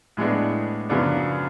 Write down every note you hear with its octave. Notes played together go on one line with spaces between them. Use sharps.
A2 G#3 B3 D4
F#2 C#3 F3 B3 D4